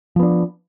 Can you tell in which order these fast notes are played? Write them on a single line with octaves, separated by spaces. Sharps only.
F3 B3 D4